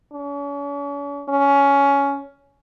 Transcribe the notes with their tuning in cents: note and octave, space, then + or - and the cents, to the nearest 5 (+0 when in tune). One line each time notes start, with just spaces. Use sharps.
C#4 +40
C#4 +15